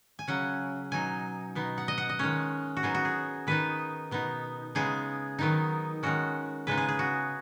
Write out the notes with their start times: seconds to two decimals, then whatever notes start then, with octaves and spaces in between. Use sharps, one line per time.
0.19 G#5
0.28 C#3 F#3 C#4 F#5
0.91 B2 F#3 D#4 G#5
1.55 B2 B3 D#4
1.78 F#5
1.88 D#5
1.98 F#5
2.09 D#5
2.19 D#3 G#3 C#4 C#5
2.77 F#4
2.83 F#3 B3 D#4 G#4
2.95 F#4
3.05 G#4
3.47 D#3 B3 D#4 B4
4.11 B2 B3 D#4
4.75 C#3 G#3 B3 D#4 G#4
5.39 D#3 F#3 B3 D#4
6.03 D#3 G#3 C#4 F#4
6.67 C#3 G#3 B3 D#4 B4
6.77 G#4
6.88 G#4
6.99 F#4